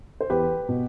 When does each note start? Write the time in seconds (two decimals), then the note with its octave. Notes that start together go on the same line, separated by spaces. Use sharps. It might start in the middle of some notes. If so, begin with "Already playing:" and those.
0.21 C5
0.30 E2 G4 B4
0.69 B2